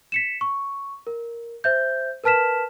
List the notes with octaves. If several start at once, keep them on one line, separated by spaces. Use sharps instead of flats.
B6 C#7 E7
C#6
A#4
C5 E5 G6
A#4 B4 A5 F6 B6 E7